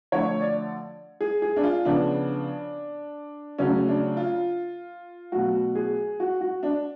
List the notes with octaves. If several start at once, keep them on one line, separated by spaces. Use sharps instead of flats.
D3 F3 A3 C#5
D5
G#4
G#4
D4
F4
C#3 F3 B3 D4
C#3 F#3 A3 C#4
D4
F4
B2 F#3 A3 F#4
G#4
F#4
F#4
D4